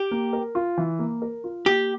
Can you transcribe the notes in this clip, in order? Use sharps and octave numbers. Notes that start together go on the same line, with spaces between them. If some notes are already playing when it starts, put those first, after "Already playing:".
Already playing: G4
A#3
A#4
F4
E3
A#3
A#4
F4
A#3 G4